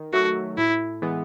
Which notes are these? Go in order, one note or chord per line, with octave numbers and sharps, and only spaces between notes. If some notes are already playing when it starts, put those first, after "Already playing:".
Already playing: D#3
F#3 A3 F#4
A2 E4
E3 G#3 B3